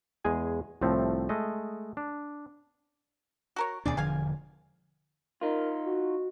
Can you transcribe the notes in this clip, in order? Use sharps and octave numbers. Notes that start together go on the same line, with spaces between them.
E2 G#3 G#4 G#5
C2 A2 F3 A3 C4
G#3 A3 D#5
D4
F#4 A#4 C#5
D#2 B2 D4 G#4 D5
E1 D3 F3 G#4 F5 G#5
D#4 F4 A#4
F#4